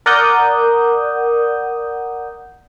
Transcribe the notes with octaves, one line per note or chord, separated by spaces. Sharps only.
A#4 D5 F#5 D#6 G6